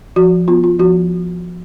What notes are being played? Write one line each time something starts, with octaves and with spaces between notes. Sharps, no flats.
F3 F#4
B3 F4
F4
F3 F#4